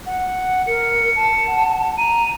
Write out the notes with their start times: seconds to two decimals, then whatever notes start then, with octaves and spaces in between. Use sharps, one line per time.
0.06 F#5
0.67 A#4 C#7
1.16 A5
1.47 F#5
1.97 A#5 D#7